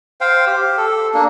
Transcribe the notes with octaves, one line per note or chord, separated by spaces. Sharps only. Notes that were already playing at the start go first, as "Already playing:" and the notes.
C5 F5 G5
G4
A4
A#3 D4